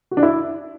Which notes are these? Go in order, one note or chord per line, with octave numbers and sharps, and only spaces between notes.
F#4
D4
E4